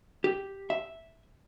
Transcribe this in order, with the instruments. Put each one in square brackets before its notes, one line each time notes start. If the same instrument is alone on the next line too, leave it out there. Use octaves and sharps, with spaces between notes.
[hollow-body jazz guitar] G4
E5